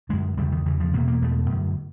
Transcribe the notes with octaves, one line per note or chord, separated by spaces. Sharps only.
F#2 D3 G#3
E2 C#3 G3
D#3
E2 C#3 E3
F3
E2 B2 A#3
A#3
E2 B2 A3
F#2 D3